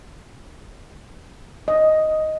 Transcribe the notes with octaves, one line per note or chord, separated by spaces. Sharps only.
D#5